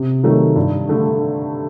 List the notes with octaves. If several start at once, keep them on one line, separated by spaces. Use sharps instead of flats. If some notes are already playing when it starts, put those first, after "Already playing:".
Already playing: C3
D#3 F#3 A3
G2
D3 A3